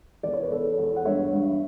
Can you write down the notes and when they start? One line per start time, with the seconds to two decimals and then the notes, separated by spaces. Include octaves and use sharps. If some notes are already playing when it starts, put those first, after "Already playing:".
0.23 E2 D5
0.33 C#5
0.43 B4
0.51 E2 A4 C#5
0.78 E2
0.96 F#5
1.05 G2 C#5 E5
1.33 G2